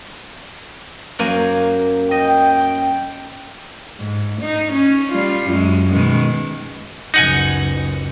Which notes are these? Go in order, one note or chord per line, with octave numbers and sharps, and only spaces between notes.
F#2 A#3 G#5
D#5 G5
G#2
D#4
C#4
G3 F4
F#2 G#3
B2 D#3 G#3
F#1 C#2 D#4 F#5 G#5